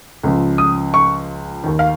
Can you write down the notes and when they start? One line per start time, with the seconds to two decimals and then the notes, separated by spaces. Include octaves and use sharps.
0.24 C#2 C#3 F3
0.58 D#6
0.94 C#6
1.63 D#2 D#3
1.79 F5